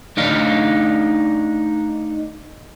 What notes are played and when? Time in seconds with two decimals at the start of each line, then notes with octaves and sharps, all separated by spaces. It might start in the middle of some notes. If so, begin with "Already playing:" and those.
0.17 A3 D4 D#4 F5